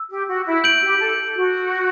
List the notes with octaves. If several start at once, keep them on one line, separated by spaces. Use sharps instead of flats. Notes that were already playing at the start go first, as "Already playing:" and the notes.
Already playing: E6
G4
F#4
E4
G6 D7 F#7
G4
A4
F#4